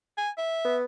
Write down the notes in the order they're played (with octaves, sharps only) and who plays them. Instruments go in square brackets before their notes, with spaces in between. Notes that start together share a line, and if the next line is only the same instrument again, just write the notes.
[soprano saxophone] G#5
E5
[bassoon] B3